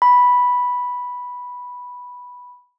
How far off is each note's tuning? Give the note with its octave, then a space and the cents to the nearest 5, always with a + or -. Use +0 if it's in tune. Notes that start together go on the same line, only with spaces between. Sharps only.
B5 -5